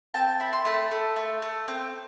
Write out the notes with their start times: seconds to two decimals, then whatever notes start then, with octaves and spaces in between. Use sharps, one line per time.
0.14 C4 G5 A5
0.40 E4 B5
0.53 C6
0.65 A3 A5 B5
0.91 A3
1.16 A3
1.42 A3
1.68 C4